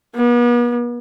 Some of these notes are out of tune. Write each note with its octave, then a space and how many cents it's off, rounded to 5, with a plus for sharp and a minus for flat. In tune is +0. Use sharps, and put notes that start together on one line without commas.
B3 -40